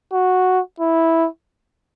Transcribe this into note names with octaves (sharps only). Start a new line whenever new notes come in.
F#4
E4